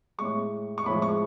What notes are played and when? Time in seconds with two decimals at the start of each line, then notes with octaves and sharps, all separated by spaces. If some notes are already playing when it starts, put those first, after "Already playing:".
0.18 A2 G#3 C#6
0.78 C#6
0.86 A2 F3 G#3 B5
1.02 C#6